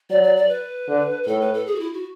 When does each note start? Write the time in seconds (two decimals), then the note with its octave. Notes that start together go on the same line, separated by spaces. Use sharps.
0.10 F#3 D5
0.23 D5
0.36 D5
0.49 B4
0.88 D3
1.24 B4
1.27 A2 A4
1.41 B4
1.54 A4
1.66 G#4
1.75 F#4
1.80 E4
1.93 F#4